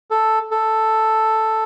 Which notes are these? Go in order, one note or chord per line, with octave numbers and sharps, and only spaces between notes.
A4
A4